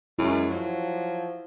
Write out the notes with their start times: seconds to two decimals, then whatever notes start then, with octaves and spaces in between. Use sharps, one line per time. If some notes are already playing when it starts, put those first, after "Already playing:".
0.19 F#2 G#3 E4
0.50 F3 F#3